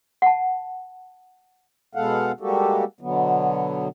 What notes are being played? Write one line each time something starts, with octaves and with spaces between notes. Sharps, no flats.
F#5 A5
B2 G#3 B3 A4 F5 F#5
G3 G#3 A#3 F#4 G4 A4
B2 D3 F#3 B3